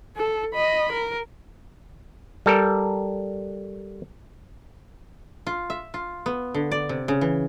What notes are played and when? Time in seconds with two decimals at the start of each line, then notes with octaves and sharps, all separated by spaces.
0.17 A4
0.54 D#5 B5
0.93 A#4
2.46 G3 A4 A#4
5.47 F4
5.70 E5
5.94 F4
6.26 B3
6.54 D3
6.71 D5
6.89 C3
7.08 C#3
7.21 E3